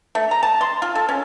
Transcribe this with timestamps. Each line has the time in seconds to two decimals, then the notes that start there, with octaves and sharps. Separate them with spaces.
0.15 A3
0.31 A#5
0.43 A5
0.61 C6
0.82 F4
0.95 A4
1.09 C#4